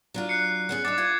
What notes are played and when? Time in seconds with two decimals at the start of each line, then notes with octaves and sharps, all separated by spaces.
0.14 F#3 D4 F4
0.29 F#6 C7 C#7
0.69 B3 C#4 G#4
0.85 D4 D#4 D6 A6
0.98 F4 B4 G#6